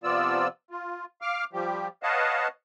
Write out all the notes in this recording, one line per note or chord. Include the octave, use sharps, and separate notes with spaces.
C3 F3 B3 F4 D5 E6
F4
F5 D6 F6
F3 G3 G4
B4 C#5 D#5 F5 F#5 A5